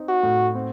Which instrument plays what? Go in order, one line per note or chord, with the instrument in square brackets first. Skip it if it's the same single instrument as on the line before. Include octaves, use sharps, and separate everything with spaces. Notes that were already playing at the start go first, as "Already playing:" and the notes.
Already playing: [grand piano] C4 D#4
[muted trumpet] F#4
[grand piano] A2
C4